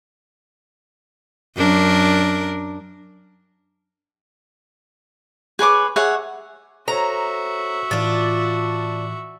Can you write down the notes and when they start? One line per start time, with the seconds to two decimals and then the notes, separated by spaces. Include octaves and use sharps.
1.57 F#2 D4 A#4
5.59 G#4 B4 C#5 D6
5.96 G#4 C#5 E5 F#5
6.88 F#4 A4 C5 C#5 E5 A#5
7.91 A2 E3 D4 F4